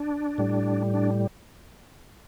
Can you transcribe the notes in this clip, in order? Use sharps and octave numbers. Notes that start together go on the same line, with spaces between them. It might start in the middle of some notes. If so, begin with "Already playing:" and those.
Already playing: D4
A2 G3
D4